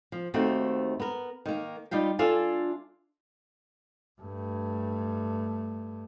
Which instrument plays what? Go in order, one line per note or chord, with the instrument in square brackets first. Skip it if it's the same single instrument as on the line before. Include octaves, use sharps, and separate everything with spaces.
[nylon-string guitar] F3
D#2 D#3 A3 A#3 C4 F#4
B3 A#4
D#3 A#3
G3 D#4 F4 G4
D4 F4 A4 E5 F5 G#5
[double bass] G2 A3